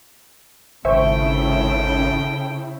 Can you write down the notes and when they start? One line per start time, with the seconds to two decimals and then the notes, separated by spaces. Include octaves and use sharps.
0.85 G#1 C#3 E4 A4 C5 E5 G5 C#6